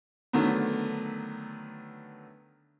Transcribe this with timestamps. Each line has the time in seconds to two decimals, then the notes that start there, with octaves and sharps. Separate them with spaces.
0.33 D3 D#3 F#3 A3 B3